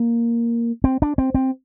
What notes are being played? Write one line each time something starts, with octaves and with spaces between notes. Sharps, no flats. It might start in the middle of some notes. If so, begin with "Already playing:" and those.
Already playing: A#3
C4
D4
C4
C4